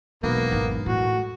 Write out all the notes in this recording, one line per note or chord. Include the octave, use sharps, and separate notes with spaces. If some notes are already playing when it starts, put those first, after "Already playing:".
E1 B1 B2 A#3 B3
G#1
A2 F#4